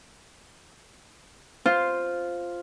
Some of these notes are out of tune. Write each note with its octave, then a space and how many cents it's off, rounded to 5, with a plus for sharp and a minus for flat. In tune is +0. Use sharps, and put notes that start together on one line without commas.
F4 +0 C5 +0